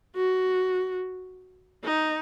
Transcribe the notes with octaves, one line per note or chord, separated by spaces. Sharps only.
F#4
D#4